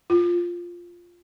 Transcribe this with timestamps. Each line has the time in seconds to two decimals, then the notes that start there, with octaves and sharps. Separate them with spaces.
0.10 F4